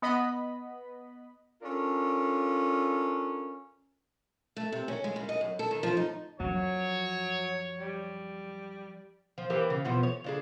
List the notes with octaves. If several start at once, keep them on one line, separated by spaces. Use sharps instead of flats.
B3 D#5 B5
C#4 D4 F4 A4 A#4
A3
C3
C#4
G#3
C#3
D#5
F#2
A4
D#3
F3
D#4
F#2 F3 F#3 C#5
G3
F3
E3 A#3 G4
C#3
E2 B2 F3
C#5
C#3 D4 G#4